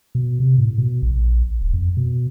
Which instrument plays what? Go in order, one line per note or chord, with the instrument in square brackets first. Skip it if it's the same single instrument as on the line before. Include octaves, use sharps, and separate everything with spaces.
[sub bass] B2
C3
A2
B2
A#1
E1
F2
B2